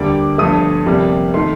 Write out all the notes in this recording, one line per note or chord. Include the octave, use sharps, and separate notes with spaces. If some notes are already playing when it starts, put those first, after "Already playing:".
Already playing: D2 D3 G3 A#3 D6
G1 G2 F3 A3 D#6
G1 F2 C3 G3 A#3
D#3 A3 C6